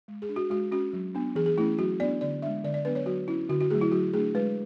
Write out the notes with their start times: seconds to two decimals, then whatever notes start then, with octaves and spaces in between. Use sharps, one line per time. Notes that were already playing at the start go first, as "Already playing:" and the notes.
0.08 G#3
0.22 G#4
0.29 D4
0.36 F#4
0.50 G#3 F#4
0.71 C#4 F#4
0.93 F#3
1.15 B3 D4
1.35 E3 G#4
1.46 G#4
1.58 A3 E4
1.61 C#4
1.79 F#3 F#4
2.00 B3 D5
2.03 D4
2.21 D3 D5
2.42 G#3 D4 E5
2.64 D3 D5
2.74 D5
2.85 F#3 B3 D4 B4
2.95 C#5
3.06 F#3 F#4
3.28 C#4 E4
3.50 D3 F#4
3.61 F#4
3.71 F#3 A3 G#4
3.81 E4
3.92 F#3 F#4
4.14 A3 D4 G#4
4.35 G#3 B4